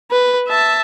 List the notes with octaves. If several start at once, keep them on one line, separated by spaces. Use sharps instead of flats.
B4
E5 A5